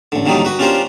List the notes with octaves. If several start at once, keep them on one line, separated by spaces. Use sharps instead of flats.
A1 D3
A#2 D3 D#3 F#3 G3 D#4
F#4 B4
C#4 D4 F4 G4 A#4 C5